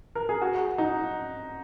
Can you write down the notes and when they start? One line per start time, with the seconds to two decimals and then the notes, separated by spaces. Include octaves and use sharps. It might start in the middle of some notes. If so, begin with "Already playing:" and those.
0.15 A#4
0.29 G#4
0.42 F#4
0.78 D#4